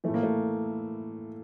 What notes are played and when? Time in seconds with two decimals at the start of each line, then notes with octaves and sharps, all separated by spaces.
0.04 A2 E3 A3
0.14 A#3
0.23 A3